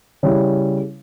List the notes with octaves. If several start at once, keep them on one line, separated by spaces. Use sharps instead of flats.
C#3 G3 C#4 E4